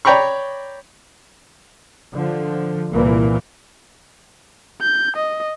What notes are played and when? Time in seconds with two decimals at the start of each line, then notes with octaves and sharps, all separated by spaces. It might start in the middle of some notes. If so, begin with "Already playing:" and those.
0.05 C#5 D5 G5 A#5 B5 C#6
2.12 D3 F3
2.91 C2 G2 A#2 E3 A#3
4.81 G6
5.16 D#5